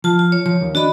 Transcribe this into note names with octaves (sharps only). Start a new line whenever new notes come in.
F3 F4 A5
F4
C#5
F3 C#5
D#2
D4 F#4 D#5 B5